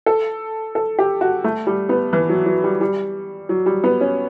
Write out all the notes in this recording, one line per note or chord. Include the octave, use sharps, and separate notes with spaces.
A4
A4
G4
F#4
A3
G3
B3
E3
F#3
F#3
G3
G3
F#3
G3
B3
C#4